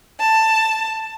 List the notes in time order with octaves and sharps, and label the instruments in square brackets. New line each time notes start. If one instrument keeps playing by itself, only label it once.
[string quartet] A5